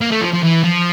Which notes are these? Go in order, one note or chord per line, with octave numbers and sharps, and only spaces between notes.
A#3
A3
F3
F3
E3
F3